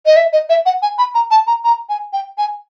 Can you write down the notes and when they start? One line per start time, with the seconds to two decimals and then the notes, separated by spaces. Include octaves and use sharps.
0.06 D#5
0.16 E5
0.33 D#5
0.49 E5
0.66 F#5
0.82 G#5
0.98 B5
1.14 A#5
1.31 A5
1.47 A#5
1.64 A#5
1.89 G#5
2.13 G5
2.38 G#5